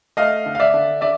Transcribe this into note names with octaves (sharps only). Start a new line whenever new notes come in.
A3 D#5 F5
D3
F5
D5 E5
D3
D3 D5 E5